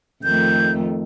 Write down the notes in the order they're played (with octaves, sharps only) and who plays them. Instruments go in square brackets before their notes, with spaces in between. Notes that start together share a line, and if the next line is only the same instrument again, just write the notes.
[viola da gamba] F2 D#3 A3 [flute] G6